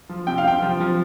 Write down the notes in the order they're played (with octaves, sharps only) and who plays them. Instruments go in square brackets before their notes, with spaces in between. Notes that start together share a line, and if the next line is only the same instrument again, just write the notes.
[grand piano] F3
C3 G5
F5
C3 G5
F3
F3